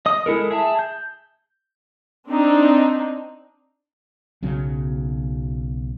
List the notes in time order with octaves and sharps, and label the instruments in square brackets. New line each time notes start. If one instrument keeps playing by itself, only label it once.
[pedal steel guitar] D#5 D#6
G#3 E4 A4 A#4
G#4 E5 A5
G6
[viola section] C4 D4 D#4
[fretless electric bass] B1 C#3 F#3